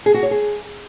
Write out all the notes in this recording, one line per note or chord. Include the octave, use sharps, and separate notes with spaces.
G#4
F#4
C#5
G#4